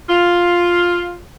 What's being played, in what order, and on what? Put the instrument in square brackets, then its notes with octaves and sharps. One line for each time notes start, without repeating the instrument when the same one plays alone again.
[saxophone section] F4